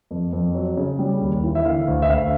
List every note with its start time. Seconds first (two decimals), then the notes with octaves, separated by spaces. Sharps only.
0.11 F2
0.33 F2
0.55 F#3
0.77 C#3
0.99 G3
1.21 D#2
1.44 E3
1.55 E5
1.65 D3 F5
1.88 D2
2.02 E5
2.09 D2 F5